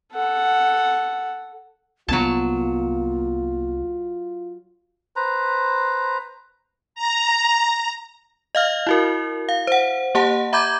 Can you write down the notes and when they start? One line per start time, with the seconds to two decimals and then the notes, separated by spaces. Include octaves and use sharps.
0.14 A4 F#5
2.08 C2 F#3 A#3 B3 F4 A5
5.16 B4 C5 A#5
6.95 A#5
8.55 D#5 F5 F6
8.87 E4 F#4 A#4
9.49 F5
9.67 C5 F#5
10.15 A#3 G4 F#5 A5
10.53 E5 A#5 B5 D6 G6 G#6